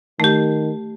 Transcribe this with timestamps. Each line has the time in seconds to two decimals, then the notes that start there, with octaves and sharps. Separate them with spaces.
0.20 D#3 A3 G4